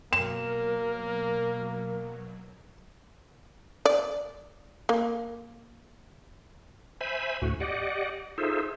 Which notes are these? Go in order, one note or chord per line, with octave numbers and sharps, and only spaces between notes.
B2 F#3 A#3 A#4 E7
D5
A#3
C5 E5 G#5 B5
D2 A2 F#4
G4 D5 D#5 F#5
D#4 F4 G#4 A4 C5 E5